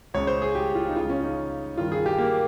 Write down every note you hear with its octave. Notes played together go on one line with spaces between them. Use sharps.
C#2 C#3 C#5
C5
G#4
G4
F4
D#4
C#2 C#3 F4
C#4
D#4
G2 D#3 F4
G#4
G4
A#3